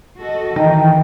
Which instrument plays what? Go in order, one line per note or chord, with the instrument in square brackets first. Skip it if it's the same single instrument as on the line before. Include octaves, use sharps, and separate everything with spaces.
[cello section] F#4 A4 D#5
[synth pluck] D#3 [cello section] E3 [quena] G5